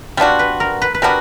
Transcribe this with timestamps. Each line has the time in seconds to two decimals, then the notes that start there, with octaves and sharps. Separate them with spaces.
0.17 G3 B3 D4 F4 F#4
0.39 B4
0.60 A#4
0.82 B4
0.94 B4
1.02 G3 B3 D4 F#4 A#4